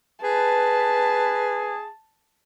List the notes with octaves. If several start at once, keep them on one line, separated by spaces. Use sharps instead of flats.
G#4 B4 A5